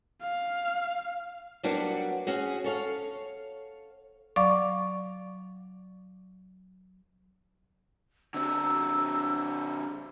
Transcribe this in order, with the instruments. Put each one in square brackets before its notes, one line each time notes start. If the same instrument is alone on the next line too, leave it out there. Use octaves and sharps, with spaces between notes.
[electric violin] F5
[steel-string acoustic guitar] F#3 G3 A#3 B3 D4 F#4
C#4 F#4 G#4
A4 C#5 F5
[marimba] F#3 D5 F5 C#6 D6
[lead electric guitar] D3 C4 [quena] E6